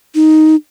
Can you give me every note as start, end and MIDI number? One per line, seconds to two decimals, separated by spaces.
0.15 0.55 63